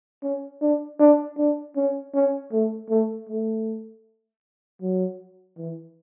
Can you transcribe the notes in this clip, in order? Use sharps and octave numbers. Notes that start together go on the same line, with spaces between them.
C#4
D4
D4
D4
C#4
C#4
A3
A3
A3
F#3
E3